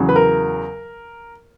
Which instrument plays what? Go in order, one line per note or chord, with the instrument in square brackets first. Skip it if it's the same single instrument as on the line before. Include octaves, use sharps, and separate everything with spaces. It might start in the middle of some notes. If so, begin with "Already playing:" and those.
Already playing: [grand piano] E2 C#3 F#3
B4
A#4